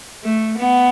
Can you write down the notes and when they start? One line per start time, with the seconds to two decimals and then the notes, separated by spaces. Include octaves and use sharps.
0.24 A3
0.58 B3